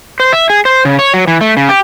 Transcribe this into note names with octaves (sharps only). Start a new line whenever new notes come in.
C5
E5
G#4
C5
C#3
C#5
F#3
E3
A3
C#3
G4